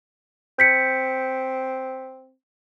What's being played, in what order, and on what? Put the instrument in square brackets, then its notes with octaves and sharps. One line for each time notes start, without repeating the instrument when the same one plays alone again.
[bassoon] C4 [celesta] G6 B6 C#7